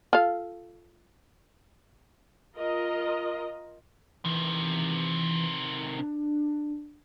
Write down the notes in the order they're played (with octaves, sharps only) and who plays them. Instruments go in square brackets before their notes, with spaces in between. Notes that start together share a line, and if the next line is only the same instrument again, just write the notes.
[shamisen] F4 A4 F5
[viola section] F4 A#4 D#5
[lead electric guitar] C3 D#3 [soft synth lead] E3
[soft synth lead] D4